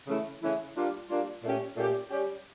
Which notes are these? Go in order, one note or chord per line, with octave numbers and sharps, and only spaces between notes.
C#3 E3 A3 C#4 E4
C#3 E3 A3 C#4 E4
G3 A#3 D4 F4
G3 A#3 D4 F4
A#2 A3 C#4 G4
A#2 A3 C#4 G4
G3 C#4 G4